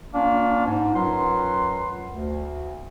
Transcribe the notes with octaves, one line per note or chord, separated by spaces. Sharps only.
A#3 C#4 D4 F4 F5
G#2
F#2 F#3 F4 B4 F#5 C6
D2